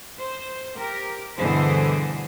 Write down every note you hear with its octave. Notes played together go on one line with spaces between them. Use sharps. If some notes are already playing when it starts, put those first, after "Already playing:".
C5
G4 A#4
G2 B2 D3 E3 G#4 C5